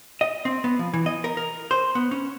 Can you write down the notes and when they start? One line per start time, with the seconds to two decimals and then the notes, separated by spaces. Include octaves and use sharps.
0.21 D#5
0.45 C4
0.64 B3
0.79 F3
0.94 E3
1.06 D#5
1.24 A#4
1.37 A#4
1.71 C5
1.95 B3
2.11 C#4